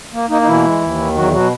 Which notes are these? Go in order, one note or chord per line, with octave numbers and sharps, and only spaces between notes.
A#3
A#3 D#4
D#4
B2 E3 E4
G#3
D#2
D#3
E2 F#3 F#4
B2 F#3 F#4